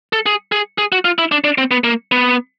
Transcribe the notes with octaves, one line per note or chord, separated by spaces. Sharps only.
A4
G#4
G#4
G#4
F#4
F4
E4
D4
D4
C4
B3
A#3
B3